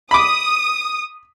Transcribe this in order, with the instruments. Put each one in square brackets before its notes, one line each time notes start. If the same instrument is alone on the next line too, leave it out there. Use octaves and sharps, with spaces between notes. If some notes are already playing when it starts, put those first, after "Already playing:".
[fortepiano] B5 D6 [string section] D#6